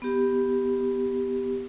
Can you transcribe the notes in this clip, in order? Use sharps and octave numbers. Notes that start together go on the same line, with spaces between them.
B3 G4